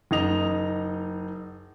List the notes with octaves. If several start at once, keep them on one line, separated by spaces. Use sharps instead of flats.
F#1 D#4 D#5 F7